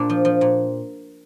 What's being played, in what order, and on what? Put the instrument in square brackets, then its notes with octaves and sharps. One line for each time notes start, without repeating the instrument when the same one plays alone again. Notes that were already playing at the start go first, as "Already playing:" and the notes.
Already playing: [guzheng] A#2 D4
F3
F3
A#2